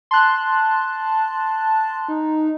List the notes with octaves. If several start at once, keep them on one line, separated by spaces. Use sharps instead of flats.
A5 C6 F#6
D#4